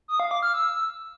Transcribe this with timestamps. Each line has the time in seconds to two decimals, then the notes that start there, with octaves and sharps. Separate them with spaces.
0.08 D#6
0.20 F5
0.31 D6
0.43 F6
0.54 E6